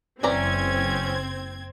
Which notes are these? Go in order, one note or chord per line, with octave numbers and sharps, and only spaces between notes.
F#1 E3 C4 C#4 D5 A#5 G#6